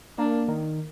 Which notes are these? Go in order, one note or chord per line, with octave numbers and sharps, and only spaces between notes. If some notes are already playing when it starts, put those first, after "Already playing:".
A#3 D4
D#3